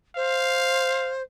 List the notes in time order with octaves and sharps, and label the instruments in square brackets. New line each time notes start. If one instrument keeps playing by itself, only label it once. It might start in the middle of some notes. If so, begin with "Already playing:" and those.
[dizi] C5 [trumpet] F5